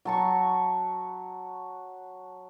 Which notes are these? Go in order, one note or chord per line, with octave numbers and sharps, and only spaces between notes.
F#3 A5 C#6